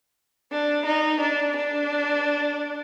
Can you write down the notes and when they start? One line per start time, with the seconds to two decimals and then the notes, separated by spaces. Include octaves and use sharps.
0.52 D4
0.85 D#4
1.21 D4
1.56 D4